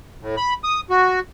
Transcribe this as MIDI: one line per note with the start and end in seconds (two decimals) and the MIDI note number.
0.22 0.35 45
0.37 0.53 83
0.64 0.80 87
0.90 1.19 66